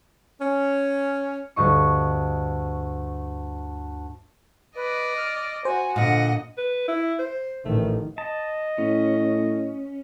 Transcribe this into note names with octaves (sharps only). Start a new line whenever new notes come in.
C#4
D2 G2 D#5 C#6
B4 D5 D#5
F6
F#4 C5 G#5
A#2 D3 D#5 F#5
B4
E4
C5
A1 D#3 A3
D#5 A5
A2 C#4